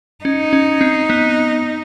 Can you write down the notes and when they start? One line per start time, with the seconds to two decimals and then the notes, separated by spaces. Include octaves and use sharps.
0.25 C#4 D#4
0.53 C#4
0.81 C4
1.10 B3